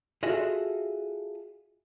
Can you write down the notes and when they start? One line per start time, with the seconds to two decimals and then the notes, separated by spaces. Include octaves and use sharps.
0.23 F4 F#4 G#4 A4 D#5 E5